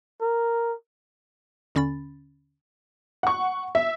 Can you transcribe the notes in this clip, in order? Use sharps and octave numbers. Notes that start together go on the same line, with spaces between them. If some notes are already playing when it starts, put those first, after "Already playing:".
A#4
D#2 D3 C#4 B5 A6
F#5 C#6
E5